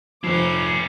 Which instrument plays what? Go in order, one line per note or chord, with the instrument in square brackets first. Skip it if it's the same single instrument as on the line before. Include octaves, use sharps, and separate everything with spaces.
[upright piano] F1 F3 [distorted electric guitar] C#4 E4 [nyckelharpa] D6 [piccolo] C7